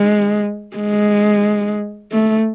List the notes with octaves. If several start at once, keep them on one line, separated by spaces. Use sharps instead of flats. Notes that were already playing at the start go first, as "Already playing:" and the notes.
Already playing: G#3
G#3
A3